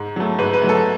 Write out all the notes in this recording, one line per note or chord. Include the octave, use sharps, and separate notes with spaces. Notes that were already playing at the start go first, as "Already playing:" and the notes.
Already playing: G#2
F#3 A3
G#2 B4
B4
F#3 A3
A4